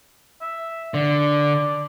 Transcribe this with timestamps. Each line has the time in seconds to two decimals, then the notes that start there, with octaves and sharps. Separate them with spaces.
0.41 E5
0.94 D3 D5